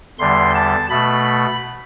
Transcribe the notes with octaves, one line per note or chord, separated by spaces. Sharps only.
E2 D3 G3 C6
A5
B2 A3 B5
B5